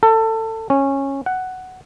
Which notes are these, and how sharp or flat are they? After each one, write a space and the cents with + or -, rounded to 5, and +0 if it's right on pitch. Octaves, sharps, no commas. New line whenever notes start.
A4 +25
C#4 -15
F#5 +5